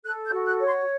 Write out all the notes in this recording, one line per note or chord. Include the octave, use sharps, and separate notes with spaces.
A4 F#6
G6
F#4
F#6
C#5
C6